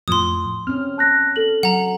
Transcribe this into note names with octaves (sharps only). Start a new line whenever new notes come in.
F2 A2 F3 C6 D#6
C4 C#4 F6
A5 F#6 A#6
A4 F#7
F#3 F#5 A#5